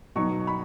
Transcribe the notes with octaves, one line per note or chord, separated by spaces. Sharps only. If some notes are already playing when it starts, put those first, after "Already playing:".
B2 F#3 D#4 C#6
B5